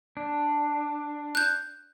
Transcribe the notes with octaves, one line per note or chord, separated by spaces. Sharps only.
D4
F#6 G6